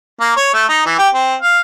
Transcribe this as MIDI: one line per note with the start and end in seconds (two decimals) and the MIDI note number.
0.21 0.32 58
0.37 0.52 73
0.54 0.67 57
0.69 0.81 63
0.86 0.99 52
0.99 1.08 67
1.14 1.35 60
1.42 1.59 77